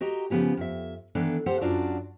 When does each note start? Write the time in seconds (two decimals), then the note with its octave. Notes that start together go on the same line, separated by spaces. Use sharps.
0.01 F#4 G4 D#5 A#5
0.30 C#3 F3 B3 G4 G#4
0.57 F2 E5
1.15 D#3 E3 B3 D4 A4
1.46 G4 A4 C5 F#5
1.61 F#2 D4 F4 F#4 D5